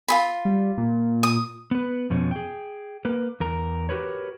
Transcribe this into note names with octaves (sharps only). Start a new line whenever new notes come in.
F4 G#4 B5
G3
A#2
D#6
B3 B4
F2 B2 F3 C#4
G#4 G5
A#3 A#4 B4
E2 A#4 A#5
F#4 G4 A#4 B4 C#5